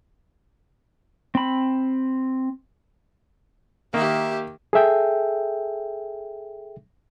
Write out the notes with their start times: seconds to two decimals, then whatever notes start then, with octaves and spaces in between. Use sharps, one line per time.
1.35 C4 B5
3.94 D#3 A#3 G4 E5
4.73 G#4 A4 E5 G5